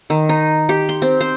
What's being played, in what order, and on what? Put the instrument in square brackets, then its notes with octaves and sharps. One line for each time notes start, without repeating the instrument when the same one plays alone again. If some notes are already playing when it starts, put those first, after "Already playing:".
[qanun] D#3
D#4
G4
C6
C4
C5